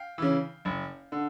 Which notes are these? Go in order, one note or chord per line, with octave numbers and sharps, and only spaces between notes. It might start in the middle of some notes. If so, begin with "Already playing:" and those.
Already playing: F5 G5
C#3 E3
F#1
D3